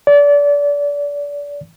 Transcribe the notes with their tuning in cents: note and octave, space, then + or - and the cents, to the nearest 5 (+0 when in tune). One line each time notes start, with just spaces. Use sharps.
D5 -30